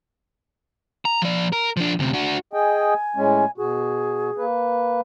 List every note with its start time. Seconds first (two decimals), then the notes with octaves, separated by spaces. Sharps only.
1.05 A#5
1.22 F3 D5
1.52 A#4
1.77 F3 D4
1.99 D2 C3
2.13 D4 F#4
2.53 G#4 D#5 G5 G#5
3.16 A2 G#3 C#4
3.58 B2 F#4 G#4
4.38 A#3 B4